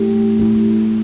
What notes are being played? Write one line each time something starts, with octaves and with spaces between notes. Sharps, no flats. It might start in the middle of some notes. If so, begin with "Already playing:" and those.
Already playing: A3 E4 G4
A3 E4 G4